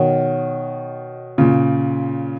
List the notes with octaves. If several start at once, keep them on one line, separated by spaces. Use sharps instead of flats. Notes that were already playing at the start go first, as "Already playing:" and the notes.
Already playing: B2 D#3 C#5 F#5
A#2 C#3